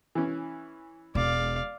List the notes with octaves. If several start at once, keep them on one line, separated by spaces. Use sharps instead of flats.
E3 C#4
E1 D5 F5